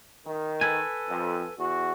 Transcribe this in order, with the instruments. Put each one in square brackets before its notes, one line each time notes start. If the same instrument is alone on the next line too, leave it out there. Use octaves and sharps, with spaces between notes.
[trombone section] D#3
[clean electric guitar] A4 B4 G#5
[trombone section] F2
E2 F#4